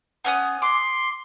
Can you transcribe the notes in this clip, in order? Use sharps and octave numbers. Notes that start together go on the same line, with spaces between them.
B3 C#4 D#6
C6 D6